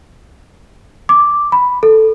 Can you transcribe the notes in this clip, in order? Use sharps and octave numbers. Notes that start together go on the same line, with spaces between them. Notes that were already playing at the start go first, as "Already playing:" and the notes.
D6
B5
A4